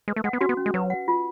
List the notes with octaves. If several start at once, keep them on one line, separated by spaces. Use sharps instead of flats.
G#3 B4
A3
G#3 F#5
B3
C#4 F#4
B3
C#4
G#3
F#3 B4
F#5
F4